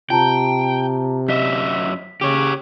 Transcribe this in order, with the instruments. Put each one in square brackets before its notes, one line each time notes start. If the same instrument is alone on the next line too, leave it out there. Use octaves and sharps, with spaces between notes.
[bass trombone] C3 [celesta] F4 A5 A#5 [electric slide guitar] G5
[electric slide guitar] F#2 D#5 E5 [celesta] B6
[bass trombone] C#3 [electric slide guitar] G4 C#5